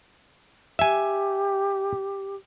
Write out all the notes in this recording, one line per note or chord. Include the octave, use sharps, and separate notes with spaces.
G4 E5 G#5